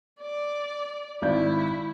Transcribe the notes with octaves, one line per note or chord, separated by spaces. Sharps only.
D5
G#1 E4 D5 G6